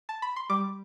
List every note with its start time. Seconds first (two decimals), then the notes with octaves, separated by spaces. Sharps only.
0.09 A5
0.22 B5
0.36 C6
0.49 G3 D6